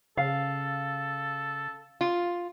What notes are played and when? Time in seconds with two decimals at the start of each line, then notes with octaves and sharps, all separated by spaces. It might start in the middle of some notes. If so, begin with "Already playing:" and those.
0.17 C#3 A4 F5
2.01 F4